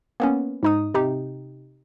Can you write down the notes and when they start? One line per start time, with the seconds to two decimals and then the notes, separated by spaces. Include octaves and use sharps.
0.20 A#3 B3 C#4
0.63 G#2 D#4 D#6
0.94 C3 D#4 G4